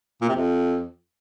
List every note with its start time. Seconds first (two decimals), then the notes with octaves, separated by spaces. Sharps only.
0.21 A#2
0.28 C3
0.36 F2